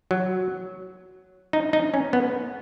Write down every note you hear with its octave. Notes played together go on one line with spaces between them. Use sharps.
F#3
D#4
D#4
C#4
B3